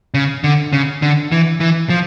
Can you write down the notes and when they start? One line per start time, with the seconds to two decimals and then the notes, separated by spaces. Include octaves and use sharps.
0.14 C#3
0.44 D3
0.73 C#3
1.02 D3
1.32 E3
1.60 E3
1.90 F3